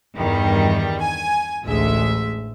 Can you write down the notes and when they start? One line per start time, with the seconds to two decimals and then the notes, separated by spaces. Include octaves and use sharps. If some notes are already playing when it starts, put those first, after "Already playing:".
0.17 E2 G2 D#3 G3
1.01 G#5
1.63 A1 D2 G#3 E5